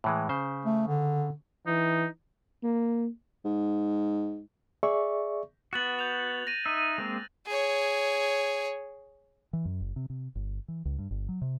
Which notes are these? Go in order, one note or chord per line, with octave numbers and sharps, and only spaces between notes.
A2 E3 G#3
C#3 C5
A3
D3
E3 D#4
A#3
G#2
G#4 D5 E5 C#6
B3 F#4 F#6 A6 F#7
G6 F7
A#6 D#7
D#4 E5
G#3 A#3 C4
G#4 C#5
E3
F#2
F#1
C3
C3
G1
E3
C#2
G2
G1
F#3
C3